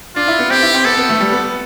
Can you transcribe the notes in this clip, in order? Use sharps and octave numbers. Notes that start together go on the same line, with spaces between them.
D4 F4
E4
B3
C4 G4
E4
C4
B3 A4
B3
A3
G3
B3
B3